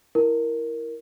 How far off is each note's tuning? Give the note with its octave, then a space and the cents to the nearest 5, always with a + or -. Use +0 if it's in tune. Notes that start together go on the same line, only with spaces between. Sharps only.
E4 +0 A#4 +0